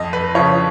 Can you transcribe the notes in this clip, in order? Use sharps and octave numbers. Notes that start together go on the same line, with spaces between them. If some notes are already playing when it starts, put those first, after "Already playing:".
Already playing: F2 D#5
B4
C#3 F3 C#5